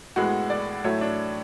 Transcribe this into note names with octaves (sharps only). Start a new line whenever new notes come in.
A2 G#3 B3 F#4
D5
A2 F#3 A3 C#5
D4